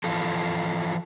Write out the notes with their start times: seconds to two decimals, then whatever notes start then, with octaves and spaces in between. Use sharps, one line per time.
0.04 E3 F3 A4